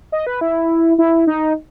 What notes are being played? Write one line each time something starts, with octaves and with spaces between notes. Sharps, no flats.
D#5
B4
E4
E4
D#4